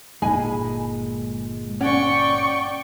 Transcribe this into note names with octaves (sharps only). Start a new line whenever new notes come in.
G1 A#2 G#3 D#4 G#5 B5
C#4 D5 F#5 G5 C#6